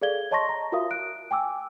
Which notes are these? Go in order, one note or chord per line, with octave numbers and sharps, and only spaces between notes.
G#4 A4 D5 F5 G#6 G7
C#5 D#5 A5 C6 C#6 A#6
A#5
F4 F#4 A#4 E5 F5 D#6
F#6 D7
G5 G#5 D6 E6